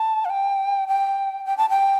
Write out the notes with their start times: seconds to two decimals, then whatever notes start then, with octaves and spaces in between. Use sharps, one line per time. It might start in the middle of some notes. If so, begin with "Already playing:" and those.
Already playing: A5
0.25 F5
0.30 G5
0.88 G5
1.45 G5
1.57 A5
1.69 G5